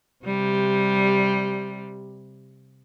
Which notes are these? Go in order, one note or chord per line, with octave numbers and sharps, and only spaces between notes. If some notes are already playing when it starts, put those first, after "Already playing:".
C3 G3